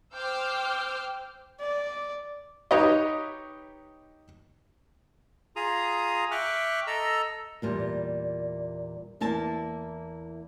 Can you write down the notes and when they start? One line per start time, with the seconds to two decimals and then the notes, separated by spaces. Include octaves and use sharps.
0.15 C5 G5 D6 E6 F6 G6
1.60 D5
2.71 D#4 G4 B4 C#5 D#5
5.56 F4 G#4 A#5 D#6
6.31 E5 G5 C#6 D6 F6 F#6
6.87 A4 D#5 A#5 E6
7.62 E2 A#2 G3
9.20 E2 A#3 E4 A5